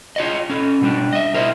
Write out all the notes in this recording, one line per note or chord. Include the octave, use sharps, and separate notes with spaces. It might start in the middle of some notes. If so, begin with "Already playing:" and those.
F4 C#5 D#5
C#4 A4
B2 G3 D4
D#5 E5
B2 A#4 C5 E5